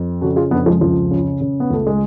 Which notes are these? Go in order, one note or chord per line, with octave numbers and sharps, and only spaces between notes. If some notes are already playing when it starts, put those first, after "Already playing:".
Already playing: F2
C#3 F#4 A4
F4 G#4
F2 B3 D4
F3 G#3
C#2 F3
C#3
C#3
B3
C#2 A3
G#3